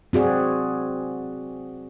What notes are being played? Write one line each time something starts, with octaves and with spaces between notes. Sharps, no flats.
C4 F#4 G#4 D5